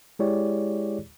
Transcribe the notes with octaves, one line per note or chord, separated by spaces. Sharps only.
G#3 E4 G4 G#4 C#5 D5